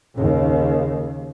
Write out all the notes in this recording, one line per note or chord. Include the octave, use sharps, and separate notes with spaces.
D#2 C#3